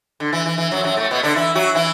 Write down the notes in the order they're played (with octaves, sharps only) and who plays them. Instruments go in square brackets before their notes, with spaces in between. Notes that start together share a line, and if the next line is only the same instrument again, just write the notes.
[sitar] D3
E3
E3
E3
F#2 F#3
F#2 F#3
A2 A3
B2 B3
D3 D4
E3 E4
F#3 F#4
E3 E4